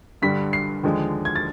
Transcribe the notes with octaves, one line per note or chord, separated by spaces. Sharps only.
G2 D3 G3 B6
C7
D#2 D3 F3 G#3
G#6
A6